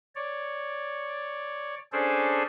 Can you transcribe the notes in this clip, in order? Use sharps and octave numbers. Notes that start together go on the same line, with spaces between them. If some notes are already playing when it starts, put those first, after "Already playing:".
C#5 D5
C#4 D4 G#4 A4 C5 D5